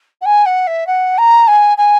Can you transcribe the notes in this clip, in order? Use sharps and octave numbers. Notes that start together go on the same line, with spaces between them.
F#5
G#5
F#5
E5
F#5
A#5
G#5
G#5